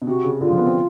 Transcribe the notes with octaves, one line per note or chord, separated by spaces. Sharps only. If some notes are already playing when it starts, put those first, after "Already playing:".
B2
C3 F#4
C#3
D3 F4
F3
B3
C4